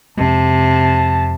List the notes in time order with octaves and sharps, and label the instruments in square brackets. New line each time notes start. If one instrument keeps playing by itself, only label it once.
[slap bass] F2 G#3 [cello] C3 [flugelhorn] A5